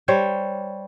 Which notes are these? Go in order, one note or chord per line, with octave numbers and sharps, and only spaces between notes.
G3 C5 C#5